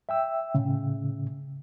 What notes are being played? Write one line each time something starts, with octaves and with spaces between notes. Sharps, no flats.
E5 G5 E6
A2 C#3